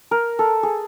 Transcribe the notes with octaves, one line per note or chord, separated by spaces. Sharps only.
A#4
A4
G#4